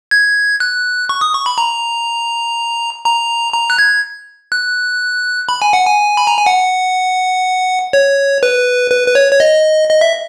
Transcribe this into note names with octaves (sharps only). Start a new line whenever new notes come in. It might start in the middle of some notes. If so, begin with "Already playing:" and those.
G#6
F#6
C#6
D#6
C#6
B5
A#5
A#5
A#5
F#6
G#6
F#6
B5
G#5
F#5
G#5
B5
A#5
G#5
F#5
C#5
B4
B4
B4
C#5
C#5
D#5
D#5
E5